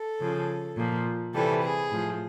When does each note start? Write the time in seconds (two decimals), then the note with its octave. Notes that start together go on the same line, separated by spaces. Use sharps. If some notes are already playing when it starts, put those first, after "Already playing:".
Already playing: A4
0.21 C#3 F3
0.78 A#2 F3
1.35 C3 E3 G3 A4
1.64 G#4
1.92 A2 F3